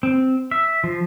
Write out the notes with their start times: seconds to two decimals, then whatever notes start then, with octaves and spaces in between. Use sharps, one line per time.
0.03 C4
0.51 E5
0.84 F3